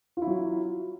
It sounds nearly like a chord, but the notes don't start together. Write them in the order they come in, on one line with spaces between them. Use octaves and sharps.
F4 E4 F#3